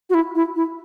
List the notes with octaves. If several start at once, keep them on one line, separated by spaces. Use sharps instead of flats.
F#4
E4
E4
E4